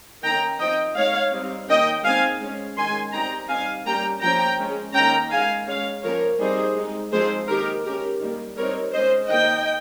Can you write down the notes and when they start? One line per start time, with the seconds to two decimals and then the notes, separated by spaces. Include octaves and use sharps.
0.23 D#3 A#3 C#4 G5 A#5
0.59 F3 C4 D#4 D#5 G5
0.95 G#3 D#4 C#5 F5
1.32 G3 C4 D#4
1.68 D#3 A#3 C#4 D#5 G5
2.04 G#3 C4 D#4 F5 G#5
2.40 G#3 C#4
2.77 D#3 G#3 C#4 G#5 C6
3.13 G3 C4 D#4 G5 A#5
3.49 G3 C4 D#4 F5 G#5
3.85 G3 A#3 C#4 G5 A#5
4.22 F3 A#3 C#4 G5 A#5
4.58 G#3 C#4
4.94 D#3 A#3 C#4 G5 A#5
5.31 G#3 D#4 F5 G#5
5.67 G#3 C#4 C#5 F5
6.03 F3 A#3 C#4 A#4 C#5
6.39 G3 C4 D#4 G#4 C5
6.76 G#3 C4 D#4
7.12 F3 G#3 C4 D#4 G#4 C5
7.48 D#3 A#3 D#4 G4 A#4
7.84 G#3 C#4 G4 A#4
8.20 D#3 G3 A#3
8.57 G3 C4 D#4 A#4 C#5
8.93 G#3 C#4 C5 D#5
9.29 D#3 A#3 D#4 D#5 G5